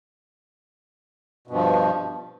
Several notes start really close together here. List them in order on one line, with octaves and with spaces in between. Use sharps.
B2 G2 F3